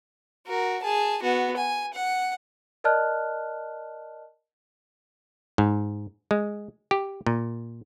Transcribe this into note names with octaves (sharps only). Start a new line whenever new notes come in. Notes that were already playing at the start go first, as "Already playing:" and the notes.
F#4 A#4
G#4 A5
B3 F#4
G#5
F#5
A#4 D5 D#5 A5 F6 F#6
G#2
G#3
G4
A#2